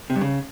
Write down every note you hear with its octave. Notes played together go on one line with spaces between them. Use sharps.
C3
G2
C#3